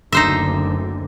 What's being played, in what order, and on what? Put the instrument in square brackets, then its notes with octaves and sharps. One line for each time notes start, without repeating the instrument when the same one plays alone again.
[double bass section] F#1 D2 D3 [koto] D#4 C5 E5